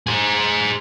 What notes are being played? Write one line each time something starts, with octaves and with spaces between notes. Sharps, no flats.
G#4 C5